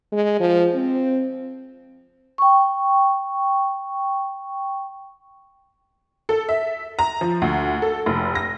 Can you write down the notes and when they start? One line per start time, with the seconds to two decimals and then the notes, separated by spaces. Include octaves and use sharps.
0.12 G#3
0.40 F3
0.75 C4
2.38 G5 C#6
6.29 A4
6.49 E5
6.99 A#5
7.21 F3
7.42 D2
7.82 A4
8.06 F1
8.35 A#6